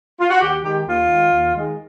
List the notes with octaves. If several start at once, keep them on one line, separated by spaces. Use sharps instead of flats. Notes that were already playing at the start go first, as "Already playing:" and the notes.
F4
F#4
D#2 G4
D#3 G#3 G4
D#2 F4
D#3 G#3
D#2
D#3 G#3